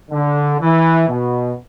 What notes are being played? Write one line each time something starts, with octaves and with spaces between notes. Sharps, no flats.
D3
E3
B2